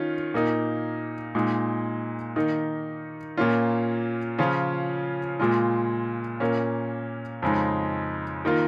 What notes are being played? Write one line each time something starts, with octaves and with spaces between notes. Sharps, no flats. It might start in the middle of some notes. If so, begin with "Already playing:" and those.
Already playing: D#3 C#4 F4
A#2 A#3 D#4
A#2 G#3 D#4
D#3 A#3 D#4
A#2 A#3 C#4 F4
C#3 F3 C#4 F4
A#2 G#3 F4
A#2 A#3 C#4
F2 C#3 G#3 D#4
D#3 A#3 F4